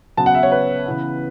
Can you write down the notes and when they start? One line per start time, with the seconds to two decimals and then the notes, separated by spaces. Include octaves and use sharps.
0.17 C#3 F#3 B3 A5
0.26 F#5
0.35 E5
0.43 C#5
0.52 B4
0.86 C#3 E3 B3